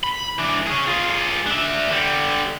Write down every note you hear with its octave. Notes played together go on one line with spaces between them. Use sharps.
B5
E3 D4
C#4 G#4
F4 G#4
D4 E5
D3 G3